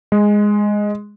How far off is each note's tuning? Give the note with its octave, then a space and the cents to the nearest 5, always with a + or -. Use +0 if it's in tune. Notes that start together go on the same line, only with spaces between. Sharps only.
G#3 -5